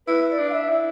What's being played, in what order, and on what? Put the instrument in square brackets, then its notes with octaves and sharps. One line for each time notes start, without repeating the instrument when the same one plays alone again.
[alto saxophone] E4 [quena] B4
[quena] D5
[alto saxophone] D4
[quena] F5
E5
[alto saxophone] E4